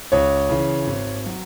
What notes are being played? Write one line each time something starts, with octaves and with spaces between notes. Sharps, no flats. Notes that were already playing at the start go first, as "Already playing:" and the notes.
C#2 C#5
C#3 E3
G#1
F#3